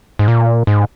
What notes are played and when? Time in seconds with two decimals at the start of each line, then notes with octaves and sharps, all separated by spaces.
0.19 G#2
0.28 A#2
0.67 G#2